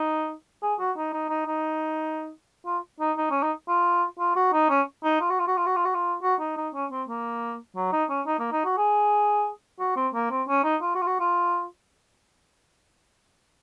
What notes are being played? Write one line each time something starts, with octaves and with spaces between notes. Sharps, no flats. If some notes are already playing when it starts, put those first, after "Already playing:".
Already playing: D#4
G#4
F#4
D#4
D#4
D#4
D#4
F4
D#4
D#4
C#4
D#4
F4
F4
F#4
D#4
C#4
D#4
F4
F#4
F4
F#4
F4
F#4
F4
F#4
F4
F#4
D#4
D#4
C#4
C4
A#3
F#3
D#4
C#4
D#4
A#3
D#4
F#4
G#4
F#4
C4
A#3
C4
C#4
D#4
F4
F#4
F4
F#4
F4